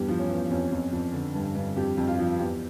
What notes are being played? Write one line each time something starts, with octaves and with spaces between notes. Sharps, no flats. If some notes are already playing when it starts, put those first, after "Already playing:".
Already playing: E2 G2 G4
F3
C#4
E2
F2 C#4
F2
F2
D3
G2
G2
F2 G4
F2
F4
F3
E2 G4